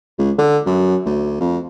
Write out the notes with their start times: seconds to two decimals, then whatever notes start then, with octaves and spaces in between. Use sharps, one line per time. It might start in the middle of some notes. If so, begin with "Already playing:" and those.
0.19 C#2
0.39 D3
0.66 F#2
1.06 D2
1.40 F2